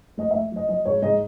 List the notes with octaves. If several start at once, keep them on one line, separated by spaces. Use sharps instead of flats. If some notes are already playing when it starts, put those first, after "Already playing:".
A3 D#5
E5
A3
F#3 D#5
F#3 D#5
G#2 C#5
G#2 D#5